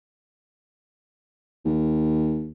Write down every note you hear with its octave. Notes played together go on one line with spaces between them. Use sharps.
D#2